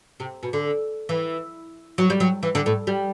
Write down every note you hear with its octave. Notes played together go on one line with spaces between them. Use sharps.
C3
B2
D3
E3
F#3
G3
F#3
E3
D3
A2
G3